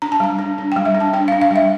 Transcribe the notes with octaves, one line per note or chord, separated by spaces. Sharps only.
D4 A#5
A5
G3 A#5
D4
D4
G3 G5
E5
D4
A5
D4 G5
D4 F5
F5
G3 E5